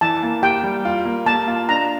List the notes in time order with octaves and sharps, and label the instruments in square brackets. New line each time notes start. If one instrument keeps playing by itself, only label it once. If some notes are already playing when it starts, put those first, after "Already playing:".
[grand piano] E3 [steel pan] A5
[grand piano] A#3
[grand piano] G4 [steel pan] G5
[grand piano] G3
F4
A#3
[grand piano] A#3 [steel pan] A5
[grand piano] F4
[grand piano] D4 [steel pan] A#5